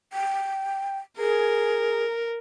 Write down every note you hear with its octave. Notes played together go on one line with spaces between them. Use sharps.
G5
G#4 A#4